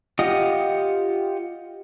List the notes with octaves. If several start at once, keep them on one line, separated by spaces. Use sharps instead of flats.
F4 G4 D#5 F#5 D#6